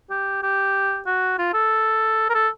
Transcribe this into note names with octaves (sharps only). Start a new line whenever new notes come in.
G4
G4
F#4
F4
A4
A#4
A4